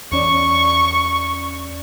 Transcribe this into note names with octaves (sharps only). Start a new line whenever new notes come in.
E2 C#4 D5 C#6